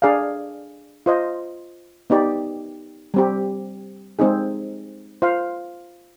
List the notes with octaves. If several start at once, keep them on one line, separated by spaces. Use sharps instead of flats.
D4 G#4 D5 F5
F4 C5 D#5
B3 D#4 G4 D5
G3 C4 G4
G#3 C4 D#4 G#4
F4 C5 F5